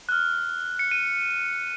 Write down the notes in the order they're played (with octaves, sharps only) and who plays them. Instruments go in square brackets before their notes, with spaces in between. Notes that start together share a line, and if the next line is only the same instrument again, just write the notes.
[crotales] F#6
F6
C#7
D#7